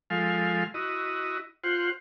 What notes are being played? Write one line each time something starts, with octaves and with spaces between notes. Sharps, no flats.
F3 G#3 A4 F5
E4 F#4 D#5
F4 C5 F#5